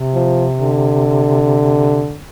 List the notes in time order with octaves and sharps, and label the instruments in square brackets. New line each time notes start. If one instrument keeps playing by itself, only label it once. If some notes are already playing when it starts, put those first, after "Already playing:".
Already playing: [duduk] C3
[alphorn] F3
D3